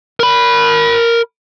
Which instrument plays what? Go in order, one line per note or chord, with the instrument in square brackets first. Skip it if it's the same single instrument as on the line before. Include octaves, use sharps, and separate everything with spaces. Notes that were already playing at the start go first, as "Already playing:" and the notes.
[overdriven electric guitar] A#4 B5